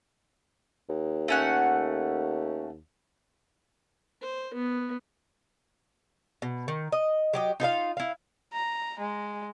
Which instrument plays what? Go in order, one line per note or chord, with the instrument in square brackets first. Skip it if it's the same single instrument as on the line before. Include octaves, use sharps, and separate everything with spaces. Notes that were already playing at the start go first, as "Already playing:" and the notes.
[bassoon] D#2
[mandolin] A3 C#4 F#5
[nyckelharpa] C5
B3
[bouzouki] B2
D#3
D#5
F#3 G4 D#5
D#4 F4 A#4 F5
E4 F5
[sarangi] A#5
G#3